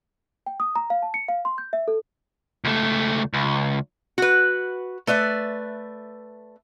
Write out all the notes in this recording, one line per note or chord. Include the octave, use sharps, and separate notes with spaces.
G5
D#6
A#5
F5
A5
C#7
F5
C6
G6
E5
A4
C#2 A3
C#2
F#4 B4
A3 B4 D5 E5